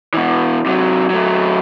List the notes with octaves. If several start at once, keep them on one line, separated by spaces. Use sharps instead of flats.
B2 E3
C3 F#3
F#3 A3